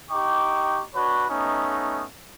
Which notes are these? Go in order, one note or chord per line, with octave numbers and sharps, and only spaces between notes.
D#4 G4 G5 C#6 D6
D4 F#4 B4 C#5
A3 B3 C#4 D#4